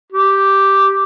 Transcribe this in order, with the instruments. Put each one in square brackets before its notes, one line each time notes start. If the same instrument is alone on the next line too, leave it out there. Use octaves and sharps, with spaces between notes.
[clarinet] G4